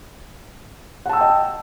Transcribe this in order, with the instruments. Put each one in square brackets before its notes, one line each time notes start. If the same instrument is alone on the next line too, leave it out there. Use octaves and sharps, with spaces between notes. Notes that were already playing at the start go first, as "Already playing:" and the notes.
[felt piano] F#5
A5
E6
G5
D#5